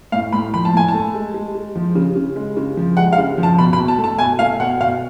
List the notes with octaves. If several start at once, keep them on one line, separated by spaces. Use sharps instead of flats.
A2 F5
A2 B5
F3 B5
A5
A2 G#5
A5
A3
G#3
G#3
G#3
F3
C#3
C#3
G#3
C#3
F3
G#3 F#5
F5
C#3
F3
A5
B2 B5
B5
B2
A5
A3
A5
B2 G#5
A3 F5
B2 F#5
B2 F5